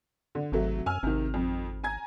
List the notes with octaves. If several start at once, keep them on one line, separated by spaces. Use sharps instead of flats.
D3
G#1 C3 F#3 A3
F#2 G#5 E6 F6
G#1 C3 D#3
F2
G#5 A#5 G#6